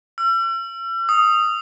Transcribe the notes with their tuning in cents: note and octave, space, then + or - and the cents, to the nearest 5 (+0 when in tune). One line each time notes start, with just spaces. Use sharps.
E6 +40
D#6 +0